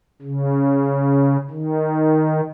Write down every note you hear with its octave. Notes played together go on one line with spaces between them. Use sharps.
C#3
D#3